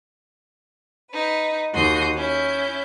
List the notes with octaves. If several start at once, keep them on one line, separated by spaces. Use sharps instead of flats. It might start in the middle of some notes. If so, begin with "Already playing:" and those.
D#4 B4
D#2 F#4 C6 D#6 G6
C#4 E4 G6